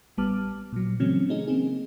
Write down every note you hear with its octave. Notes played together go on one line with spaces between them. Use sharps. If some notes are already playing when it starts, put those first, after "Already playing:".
A1 G3 B3 A5 D6 F6
A#2 F#3
C#3 E3 F#3 A3 C4 C#4
A3 C#4 D#4 G#4
A#3 C4 G#4